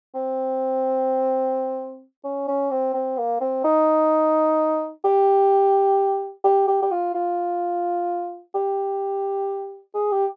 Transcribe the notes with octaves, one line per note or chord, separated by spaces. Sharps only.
C4
C#4
C#4
C4
C4
A#3
C4
D#4
G4
G4
G4
G4
F4
F4
G4
G#4
G4